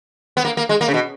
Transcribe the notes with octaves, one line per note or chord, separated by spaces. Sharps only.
B3
A#3
A#3
G#3
A#3
C#3
B2